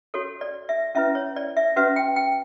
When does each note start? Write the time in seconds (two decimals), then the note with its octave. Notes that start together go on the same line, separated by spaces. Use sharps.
0.14 F#4 A4 C#5
0.41 D5
0.69 E5
0.95 C#4 E4 B4 E5
1.15 C#5
1.36 D5
1.57 E5
1.76 C#4 F#4 B4 E5
1.96 G5
2.16 G5